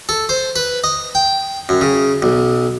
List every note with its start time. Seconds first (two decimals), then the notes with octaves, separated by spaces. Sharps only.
0.09 A4
0.29 C5
0.56 B4
0.84 D#5
1.15 G5
1.69 F#2
1.81 C#3
2.22 B1